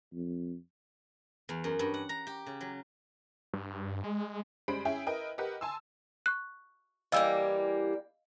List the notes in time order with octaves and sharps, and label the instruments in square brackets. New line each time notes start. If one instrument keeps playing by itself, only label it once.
[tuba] F2
[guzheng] E2
F#2
G2
F#5
A#5
G4
C#3
F#3
[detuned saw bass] G2
G#3
[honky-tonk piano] F#2 G3 G#3 C5 B5 D7
C#4 E4 G#4 E5 G5
E4 A#4 B4 D#5 G5
G4 A#4 B4 D#5 F#5
G#5 A5 C6 E6
[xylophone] C#6 F#6
[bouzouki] E3 G3 A#3 [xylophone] D#5 F5 E6